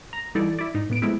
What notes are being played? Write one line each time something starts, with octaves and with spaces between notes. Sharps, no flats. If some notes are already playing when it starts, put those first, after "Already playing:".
A#5
E3 G3 D#4 E4 A4 D5
E4 D5
G#2 D#4
A2 B3 D7
F3 G#3 A3 B3 E4